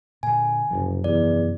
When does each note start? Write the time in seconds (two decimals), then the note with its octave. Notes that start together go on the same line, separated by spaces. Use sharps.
0.23 A#2 D3 G#5
0.71 F#1 F#2 C3 F3
1.04 E2 D5